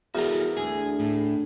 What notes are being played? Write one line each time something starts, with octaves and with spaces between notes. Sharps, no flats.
E2 F#4 A4 A#4 A#5
D2 G#4
A2